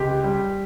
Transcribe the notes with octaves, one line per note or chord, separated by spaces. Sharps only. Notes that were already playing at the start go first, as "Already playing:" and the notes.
Already playing: C#2 G4
G3